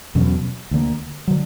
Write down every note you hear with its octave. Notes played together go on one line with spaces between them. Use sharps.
E2 B2 F#3 C#4
D2 D3 A#3
F#3
D3